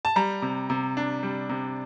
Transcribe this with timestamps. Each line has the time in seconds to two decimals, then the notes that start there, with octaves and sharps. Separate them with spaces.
0.05 A5
0.16 G3 A#5
0.42 C3
0.70 C3
0.97 D4
1.23 G3
1.49 C3